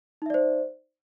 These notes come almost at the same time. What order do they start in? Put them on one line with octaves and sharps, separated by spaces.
D#4 E5 D5 C5